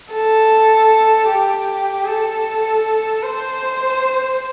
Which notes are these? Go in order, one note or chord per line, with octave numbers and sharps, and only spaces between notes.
A4
G4
A4
C5